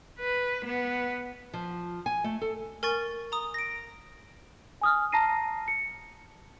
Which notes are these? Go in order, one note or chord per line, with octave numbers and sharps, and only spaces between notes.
B4
B3
F3
G#5
A3
A4
A#4 G#5 C#6 A6
A#5 D#6
A#6 D7
G#5 D#6 F6
A5 A#5 A#6 C7 D#7
C#7